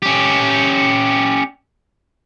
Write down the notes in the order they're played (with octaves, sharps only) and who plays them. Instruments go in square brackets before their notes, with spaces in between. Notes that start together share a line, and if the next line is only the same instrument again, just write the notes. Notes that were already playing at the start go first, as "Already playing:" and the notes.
[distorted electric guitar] C#4 G4